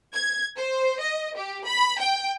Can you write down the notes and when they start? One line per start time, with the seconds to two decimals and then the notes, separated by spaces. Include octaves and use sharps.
0.14 G#6
0.57 C5
1.00 D#5
1.36 G4
1.66 B5
1.99 G5